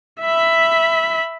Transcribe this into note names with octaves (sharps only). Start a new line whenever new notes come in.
E5 B5